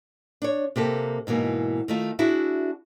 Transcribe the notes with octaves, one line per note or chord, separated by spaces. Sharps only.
D4 C#5
C3 A#3 G4 A4
G#2 B2 E3 A#3 D#4
D#3 A3 F4
D4 E4 F#4 G#4 E5